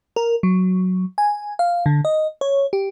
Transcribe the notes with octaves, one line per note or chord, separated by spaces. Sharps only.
A#4
F#3
G#5
F5
D3
D#5
C#5
G4